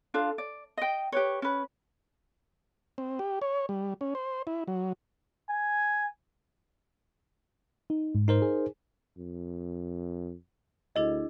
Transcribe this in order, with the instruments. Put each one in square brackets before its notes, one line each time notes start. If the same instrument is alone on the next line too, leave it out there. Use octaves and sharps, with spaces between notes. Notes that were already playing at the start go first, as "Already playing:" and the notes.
[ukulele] D4 F4 A4 F5
D5
D#5 G5
G4 B4 C#5
C#4 B4
[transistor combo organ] C4
G4
C#5
G3
C#4
C5
E4
F#3
[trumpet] G#5
[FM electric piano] D#4
G#2
[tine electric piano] D#4 A#4 C5
[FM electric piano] G#4
[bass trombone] F2
[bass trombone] D2 [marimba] D4 E4 G#4 [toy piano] D#5